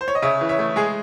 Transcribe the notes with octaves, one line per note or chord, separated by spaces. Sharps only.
C5
C#5
D#5
C#3 C#5 E5
E3
C#5 E5
A3
G#3 G#4